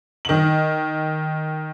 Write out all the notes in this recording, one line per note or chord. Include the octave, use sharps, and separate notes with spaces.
D#3 F#7